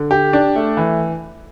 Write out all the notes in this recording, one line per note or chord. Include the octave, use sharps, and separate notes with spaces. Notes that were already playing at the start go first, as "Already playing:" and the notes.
Already playing: D3
G4
D4
A3
E3